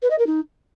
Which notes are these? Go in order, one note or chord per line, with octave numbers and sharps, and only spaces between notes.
B4
D#5
A#4
D#4